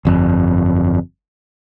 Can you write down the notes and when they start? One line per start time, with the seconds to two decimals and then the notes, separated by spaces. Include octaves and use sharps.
0.05 G1 F2